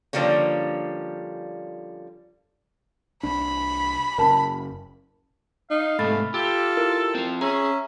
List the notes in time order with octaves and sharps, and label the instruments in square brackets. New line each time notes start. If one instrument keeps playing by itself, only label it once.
[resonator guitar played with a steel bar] D3 F3 G3 A#3 C#4
[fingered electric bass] C2 D4 [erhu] B5
[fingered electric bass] F#1 C#3 [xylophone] A#4 A5
[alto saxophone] D#4 [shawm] F5
[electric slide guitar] G#2 C3 [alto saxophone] A3 [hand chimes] B5 A6
[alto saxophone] F4 [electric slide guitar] G4 [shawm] A4
[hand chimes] E4 A#4
[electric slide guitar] C4 F4
[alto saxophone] C#4 [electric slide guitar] G#4 [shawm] E5 [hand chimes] A#5